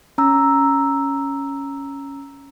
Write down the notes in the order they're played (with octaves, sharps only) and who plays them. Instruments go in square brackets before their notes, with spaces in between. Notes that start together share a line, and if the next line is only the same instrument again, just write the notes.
[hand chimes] C#4 A#5 E6